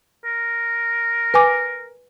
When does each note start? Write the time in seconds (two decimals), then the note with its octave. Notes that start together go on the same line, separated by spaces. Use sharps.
0.25 A#4
1.34 B4 G#5 D6